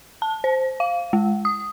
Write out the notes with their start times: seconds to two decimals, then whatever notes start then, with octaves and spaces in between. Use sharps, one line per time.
0.22 A5
0.44 C5
0.80 F5
1.13 G#3
1.45 D#6